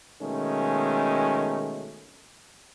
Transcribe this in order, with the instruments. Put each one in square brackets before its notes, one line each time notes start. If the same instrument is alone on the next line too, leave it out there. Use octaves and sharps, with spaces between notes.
[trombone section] B2 D#3 G#3 A3 C#4